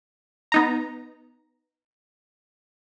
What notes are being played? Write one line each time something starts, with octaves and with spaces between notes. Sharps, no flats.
B3 D#4 A#5